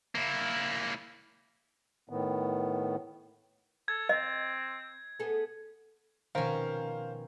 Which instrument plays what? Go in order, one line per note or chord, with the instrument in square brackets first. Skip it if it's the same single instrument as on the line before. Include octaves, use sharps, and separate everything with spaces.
[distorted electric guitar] A#3 E4
[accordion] A2 D#3 B3
[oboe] A4 [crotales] G#6
[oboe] C4 [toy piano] D#5
[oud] B3 G#4 A4
[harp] B2 F3 A#4 [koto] D#3 C#4 [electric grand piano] C5 F5